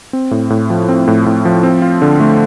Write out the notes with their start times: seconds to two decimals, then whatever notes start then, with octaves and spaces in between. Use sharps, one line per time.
0.13 C4
0.31 A2
0.50 A2
0.70 F3
0.89 C4
1.08 A2
1.26 A2
1.45 F3
1.63 C4
1.82 F4
2.02 D3
2.20 A3